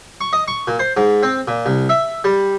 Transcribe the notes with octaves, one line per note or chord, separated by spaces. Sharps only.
C#6
D#5
C#6
A#2
C5
G#2
C4
A#2
C2
E5
G3